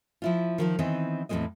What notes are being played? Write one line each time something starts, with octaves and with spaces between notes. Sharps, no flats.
F3 E4 F4
D#3 F3 A#4
D#3 E3 B3 C4 D#4
E2 A2 E3 G#3 C4 D#5